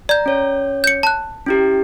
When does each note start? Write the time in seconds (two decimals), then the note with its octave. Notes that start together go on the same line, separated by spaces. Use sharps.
0.09 D5 A#5 G6
0.26 C#4 C#5
0.84 G6 C#7
1.03 A5 F#6
1.46 C#4 E4 G4